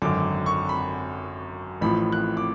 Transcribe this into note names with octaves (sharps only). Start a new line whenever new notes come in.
G#1 F#2 D3 F#3 D6
C#6
B5
A1 A2 F3 B5
F#6
D6